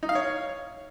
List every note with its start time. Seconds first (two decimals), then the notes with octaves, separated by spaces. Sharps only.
0.03 D#4
0.09 F5
0.15 C#5